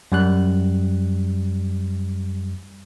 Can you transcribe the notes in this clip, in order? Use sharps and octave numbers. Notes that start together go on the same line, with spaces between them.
F#2 G3 F#6